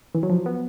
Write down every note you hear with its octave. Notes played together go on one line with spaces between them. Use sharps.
E3
F#3
F3
B3